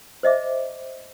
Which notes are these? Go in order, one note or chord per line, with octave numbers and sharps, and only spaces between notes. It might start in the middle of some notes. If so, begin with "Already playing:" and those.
C5 D#5 E5 D6